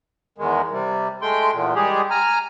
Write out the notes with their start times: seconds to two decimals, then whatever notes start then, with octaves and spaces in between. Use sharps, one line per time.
0.38 E2 D#3 G#3
0.71 C3 G3
1.22 G#3 A3 G5 C6
1.53 E2 A#2
1.75 G3 G#3 G4 G#4
2.11 G#5 A#5 F6